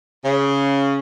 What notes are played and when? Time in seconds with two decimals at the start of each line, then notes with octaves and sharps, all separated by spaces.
0.24 C#3